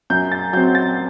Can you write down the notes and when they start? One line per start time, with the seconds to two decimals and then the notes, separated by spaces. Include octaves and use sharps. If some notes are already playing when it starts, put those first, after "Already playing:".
0.10 F#2 G6
0.32 A6
0.53 F#3 G6
0.57 C4
0.75 A6